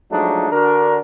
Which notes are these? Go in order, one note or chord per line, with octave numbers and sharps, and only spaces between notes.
F3 F#3 G#3 A3 D4 D#4
D3 D4 F#4 A#4